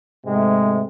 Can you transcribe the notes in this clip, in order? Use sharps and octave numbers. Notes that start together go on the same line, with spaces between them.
G#2 C3 G#3 A3